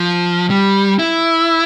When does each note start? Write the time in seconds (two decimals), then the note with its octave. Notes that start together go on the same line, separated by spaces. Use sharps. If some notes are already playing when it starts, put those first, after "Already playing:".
Already playing: F3
0.50 G3
0.99 E4